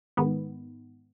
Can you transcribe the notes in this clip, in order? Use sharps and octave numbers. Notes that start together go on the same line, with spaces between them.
G#2 D#3 B3